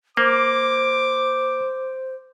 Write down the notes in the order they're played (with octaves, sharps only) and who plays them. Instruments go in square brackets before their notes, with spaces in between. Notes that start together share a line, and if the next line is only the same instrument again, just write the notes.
[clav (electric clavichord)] A#3 [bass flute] C5 [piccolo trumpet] D6